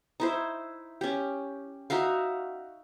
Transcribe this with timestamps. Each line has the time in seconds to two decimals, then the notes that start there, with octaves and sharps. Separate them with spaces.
0.20 D#4 E4 C5
1.01 C#4 G4
1.90 D#4 F#4 E5 F5